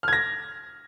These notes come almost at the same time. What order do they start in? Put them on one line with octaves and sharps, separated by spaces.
F6 G#6 A#6